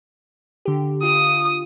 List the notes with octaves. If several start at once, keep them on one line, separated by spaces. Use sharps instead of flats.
D3 G4
F4 D#6